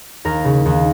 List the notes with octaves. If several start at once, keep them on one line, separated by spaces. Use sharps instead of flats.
D#2 A#4
C#3
D#2